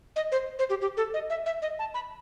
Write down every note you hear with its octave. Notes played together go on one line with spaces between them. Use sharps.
D#5
C5
C5
G4
G4
A4
D#5
E5
E5
D#5
A5
B5